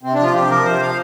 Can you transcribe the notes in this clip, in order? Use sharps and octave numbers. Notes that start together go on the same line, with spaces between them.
C3 C4
D4
F3 F4
C3 G4
F3 A#4
C3 C5
F3 F5